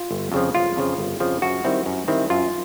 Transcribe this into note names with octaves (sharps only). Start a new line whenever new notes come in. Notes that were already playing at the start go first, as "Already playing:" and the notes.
Already playing: F4
G1
F2 C#3 F3
G1 F4
F2 C#3 F3
G1
F2 C#3 F3
F#2 F#4
D#3 G3 C4 E4
F#2
D#3 G3 C4 E4
F#2 F4